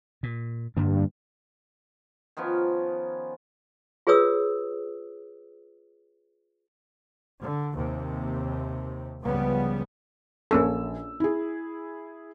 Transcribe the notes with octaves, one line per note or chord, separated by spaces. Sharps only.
A#2
G2 D3 A#3 D4
D#3 F3 B3 C#4
F4 G#4 B4 C#5 D#6 E6
D3
D#2 C3
C#2 C#3 F3 G3 B3
A#1 A#3 C#4 A4 E6
E4 G#4